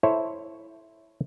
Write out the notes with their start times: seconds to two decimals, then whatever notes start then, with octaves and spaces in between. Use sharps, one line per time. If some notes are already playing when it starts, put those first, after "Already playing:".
0.03 E4 A4 C5 C#5 E5